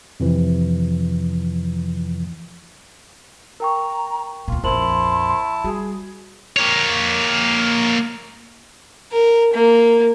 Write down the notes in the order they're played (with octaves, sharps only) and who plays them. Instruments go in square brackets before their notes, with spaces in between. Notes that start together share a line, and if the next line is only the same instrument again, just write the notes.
[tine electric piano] F2 C3 E3 F3
[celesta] A#4 G5 C#6 [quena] A#5
[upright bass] D2 A#2 [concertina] F4
[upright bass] A#1 F2 [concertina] E4 A5 [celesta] A#4 C5 F#7 [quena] C6
[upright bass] G3 [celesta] F#4 [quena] G#4
[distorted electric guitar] A#3 C#5
[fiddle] A#4
A#3